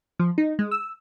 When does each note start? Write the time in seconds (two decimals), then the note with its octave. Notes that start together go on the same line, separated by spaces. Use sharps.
0.19 F3
0.38 D#4
0.59 G#3
0.71 E6